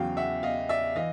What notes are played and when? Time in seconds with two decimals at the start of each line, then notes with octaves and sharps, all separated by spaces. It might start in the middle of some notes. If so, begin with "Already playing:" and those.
Already playing: E2 C#3 F#3 F5 G5
0.17 E5 F#5
0.43 D#5 F5
0.69 D5 E5
0.96 E3 D#5 F5